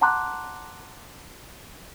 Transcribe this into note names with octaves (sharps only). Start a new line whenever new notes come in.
F#5 A5 A#5 C6 D6 F#6